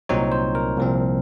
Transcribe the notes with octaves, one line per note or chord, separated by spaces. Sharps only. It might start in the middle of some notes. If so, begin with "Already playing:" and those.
C2 A#2 F#3 C4 D#4 C#5
C5
A#4
C2 A#2 F3 C4